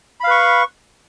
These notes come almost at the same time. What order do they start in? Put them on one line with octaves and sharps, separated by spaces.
B5 F5 B4 C#6